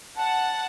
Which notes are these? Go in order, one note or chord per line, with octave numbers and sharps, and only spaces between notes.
F#5 A5